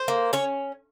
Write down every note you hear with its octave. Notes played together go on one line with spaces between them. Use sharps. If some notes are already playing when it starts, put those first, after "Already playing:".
Already playing: C5
A#3
C#4 C#5